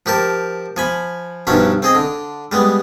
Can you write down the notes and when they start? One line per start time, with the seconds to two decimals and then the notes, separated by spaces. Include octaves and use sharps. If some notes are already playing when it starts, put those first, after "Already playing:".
0.06 F3 G4 A#4 A5
0.77 F3 G#5 B5
1.47 B1 G2 F3 F#3 C#4 E5
1.82 C4 G#4 D#5
1.95 D3
2.52 G3 G#3 B3